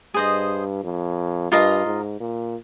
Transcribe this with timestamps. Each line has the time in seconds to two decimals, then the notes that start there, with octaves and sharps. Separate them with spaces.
0.14 G2 G#4 C5 D#5
0.83 F2
1.52 G2 F4 A#4 D#5 A#5
1.86 G#2
2.20 A#2